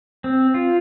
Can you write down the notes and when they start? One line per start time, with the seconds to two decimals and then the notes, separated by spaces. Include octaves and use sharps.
0.24 C4
0.54 F4